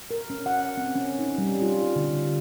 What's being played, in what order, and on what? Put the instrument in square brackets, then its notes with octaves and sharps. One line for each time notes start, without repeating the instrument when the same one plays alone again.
[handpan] A#4
C#4
F#5
C4
C#4
D#4
G3
F4
D3